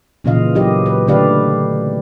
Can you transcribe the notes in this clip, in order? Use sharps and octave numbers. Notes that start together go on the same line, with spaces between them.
A#2 C#3 E3 F4 D#5 F5
F#3 A#3 E4 G4 D#5
B4
D3 A3 G4 B4 D5 F5